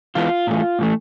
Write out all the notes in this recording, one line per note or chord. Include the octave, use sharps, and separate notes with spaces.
E3 G#3 B3 F4
A2 E3 A3
A2 E3 A3